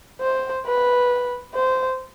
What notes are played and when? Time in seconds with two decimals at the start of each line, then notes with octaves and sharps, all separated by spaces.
0.21 C5
0.65 B4
1.54 C5